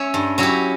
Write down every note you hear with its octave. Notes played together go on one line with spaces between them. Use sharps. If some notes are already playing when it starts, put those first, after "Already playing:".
Already playing: C#4 C#5 E5
G2
F#3 C#4 E4 G4